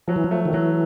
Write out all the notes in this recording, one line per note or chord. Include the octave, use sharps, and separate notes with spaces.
F3 F#3
E3
F3
A3
D#3
E3 F#3